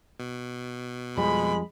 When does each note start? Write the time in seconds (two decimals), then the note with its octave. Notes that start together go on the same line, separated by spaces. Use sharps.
0.20 B2
1.17 F2 F3 G3 G#3 B5